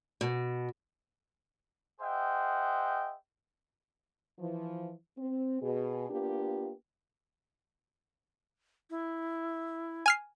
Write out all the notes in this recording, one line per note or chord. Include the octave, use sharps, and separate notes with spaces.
B2
G#4 C5 D#5 E5 F#5 G5
E3 F3
C4
B2 G#4
A#3 B3 D4 F4 G4
E4
G#5 F6 C7